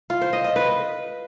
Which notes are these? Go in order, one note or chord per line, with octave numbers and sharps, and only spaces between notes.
F4
C5
D#5
D#5
B4